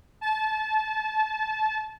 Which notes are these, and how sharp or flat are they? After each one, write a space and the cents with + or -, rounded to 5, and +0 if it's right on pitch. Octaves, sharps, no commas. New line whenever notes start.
A5 -25